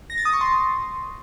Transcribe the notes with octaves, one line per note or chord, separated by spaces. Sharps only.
A#6
A6
D#6
C#6
C6